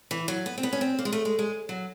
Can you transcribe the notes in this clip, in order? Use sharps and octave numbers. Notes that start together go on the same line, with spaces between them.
E3
F#3
B3
C4
B3
C#4
C4
A#3
G#3
A3
G#3
G#3
F#3